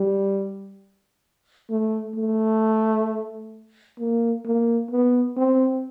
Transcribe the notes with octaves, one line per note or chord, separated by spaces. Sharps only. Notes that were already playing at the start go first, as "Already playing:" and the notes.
Already playing: G3
A3
A3
A#3
A#3
B3
C4